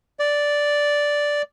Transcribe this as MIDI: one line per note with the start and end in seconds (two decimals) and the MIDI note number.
0.20 1.42 74